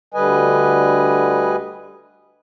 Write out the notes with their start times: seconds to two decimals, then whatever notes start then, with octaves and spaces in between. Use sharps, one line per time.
0.14 D2 D3 G3 B4 D#5 G#5